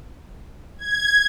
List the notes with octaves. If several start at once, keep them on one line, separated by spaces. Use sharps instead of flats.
G#6